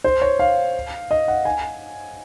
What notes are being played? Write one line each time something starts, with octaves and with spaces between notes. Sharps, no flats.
C5
C#5
F5
D#5
F#5
G#5